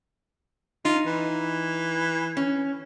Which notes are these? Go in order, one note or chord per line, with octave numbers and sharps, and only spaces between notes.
D#4 F4
E3
C#4